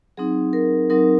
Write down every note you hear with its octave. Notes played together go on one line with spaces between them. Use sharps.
F#3 C4 D#4 G#4
A#4
F#3 C4 D#4 A#4